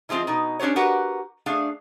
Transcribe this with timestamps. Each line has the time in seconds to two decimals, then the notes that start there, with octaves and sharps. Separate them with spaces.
0.09 E3 F3 G#3 C4 F4
0.27 B2 D#4
0.59 C#4 D4 G4 C5 C#5
0.76 F#4 G4 A#4 B4 F#5
1.46 A3 D4 G#4 F5